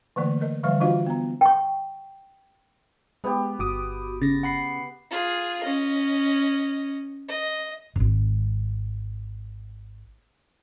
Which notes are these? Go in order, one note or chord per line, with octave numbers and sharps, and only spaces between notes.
D3 E3 A3 A#3 D5
A#4 D#5
D3 E3 F3 G3 E5 F5
E3 D4 F4 F#4 D#5 F5
B3 A#5
G5 C#6
G#3 B3 G4
G1 F#4 D6 D#6
C#3 A6 A#6
F#5 B5 C7
F4 G#4
C#4 D#5
D#5
D#1 G#1